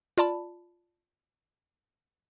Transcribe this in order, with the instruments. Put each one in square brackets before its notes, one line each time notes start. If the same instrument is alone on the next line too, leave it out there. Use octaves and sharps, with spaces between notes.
[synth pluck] F4 D5 A5 B5